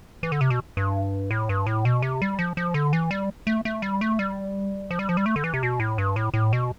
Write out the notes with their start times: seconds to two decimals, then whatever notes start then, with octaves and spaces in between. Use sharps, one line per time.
0.23 E3
0.32 D3
0.41 C3
0.50 B2
0.77 G2
1.31 A2
1.49 G2
1.66 A2
1.85 B2
2.02 C3
2.22 G3
2.39 F3
2.57 F3
2.74 D3
2.93 E3
3.11 G3
3.47 A3
3.65 A3
3.82 G3
4.01 A3
4.19 G3
4.91 F3
4.99 G3
5.09 F3
5.17 G3
5.26 A3
5.36 D3
5.44 E3
5.54 C3
5.63 B2
5.80 A2
5.98 G2
6.16 A2
6.34 A2
6.53 B2